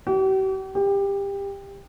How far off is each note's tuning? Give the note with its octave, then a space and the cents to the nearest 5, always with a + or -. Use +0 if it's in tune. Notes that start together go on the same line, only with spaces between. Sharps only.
G4 -45
G4 +20